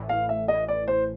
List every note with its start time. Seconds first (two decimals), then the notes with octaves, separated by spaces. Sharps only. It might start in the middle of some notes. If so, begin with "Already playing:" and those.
Already playing: A1 A2 E3
0.09 F5
0.29 E5
0.48 A1 A2 E3 D#5
0.68 D5
0.88 C5